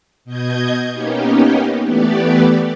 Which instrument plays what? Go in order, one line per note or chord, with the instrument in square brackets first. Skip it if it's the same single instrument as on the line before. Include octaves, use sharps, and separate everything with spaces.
[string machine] B2 D#5 G6 G#6
A#3 B3 C#4 D#4 G4
E3 A3 B3 G4 B4 D5